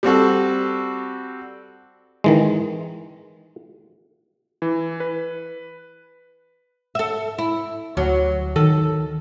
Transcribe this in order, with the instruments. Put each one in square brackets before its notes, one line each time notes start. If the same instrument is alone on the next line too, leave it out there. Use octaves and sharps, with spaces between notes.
[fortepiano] G3 C4 F#4 A4
[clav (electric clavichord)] D#3 E3 G#3
[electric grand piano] E3
B4
[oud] A4 E5
E4
[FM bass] D2 [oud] F#3
[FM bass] D#3 [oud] A4